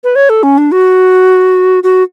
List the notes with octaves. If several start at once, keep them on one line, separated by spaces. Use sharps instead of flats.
B4
C#5
A4
C#4
D4
F#4
F#4